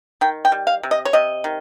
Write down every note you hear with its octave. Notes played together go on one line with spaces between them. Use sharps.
D#3 G5
G5
G3
F5
C3
D#5
C#5
C3 D#5
D#3